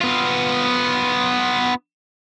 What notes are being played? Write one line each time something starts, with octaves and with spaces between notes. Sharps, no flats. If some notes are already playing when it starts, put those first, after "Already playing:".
B3 F4